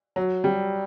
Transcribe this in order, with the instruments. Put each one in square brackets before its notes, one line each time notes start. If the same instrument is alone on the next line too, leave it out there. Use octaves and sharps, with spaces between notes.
[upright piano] F#3
G3